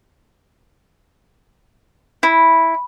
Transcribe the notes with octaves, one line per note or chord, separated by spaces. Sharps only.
E4